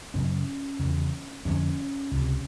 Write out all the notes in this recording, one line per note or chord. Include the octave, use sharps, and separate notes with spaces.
F#2 C#3 C#4
E2 C#3
F2 D3 C#4
C#2 C3